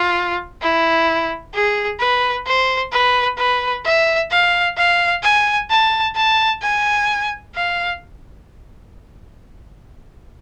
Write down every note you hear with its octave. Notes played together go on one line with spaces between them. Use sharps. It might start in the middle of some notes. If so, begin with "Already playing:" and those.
Already playing: F4
E4
G#4
B4
C5
B4
B4
E5
F5
F5
G#5
A5
A5
G#5
F5